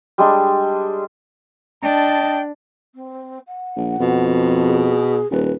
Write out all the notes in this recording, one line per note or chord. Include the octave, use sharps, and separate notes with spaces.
G3 G#3 D4
D4 D#5 G5 A5
C4
F#5
A#1
F2 B2
G#4
D#1 B4